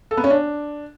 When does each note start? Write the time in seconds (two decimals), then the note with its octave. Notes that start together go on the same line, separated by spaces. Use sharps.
0.11 A4
0.17 B3
0.24 C#4
0.30 D4